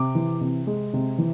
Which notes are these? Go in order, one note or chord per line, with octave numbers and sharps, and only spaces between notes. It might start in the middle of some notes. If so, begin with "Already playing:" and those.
Already playing: C3 D6
E3
C3
G#3
C3
E3